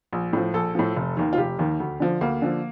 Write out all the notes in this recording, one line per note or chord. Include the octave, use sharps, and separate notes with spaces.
A#1
A2 F3
A#1 A4
A2 F3
F1
D#2 D#3
F4
F1 G4
D#2 D#3
D2
D3 F3
D2 A#3
D3 F3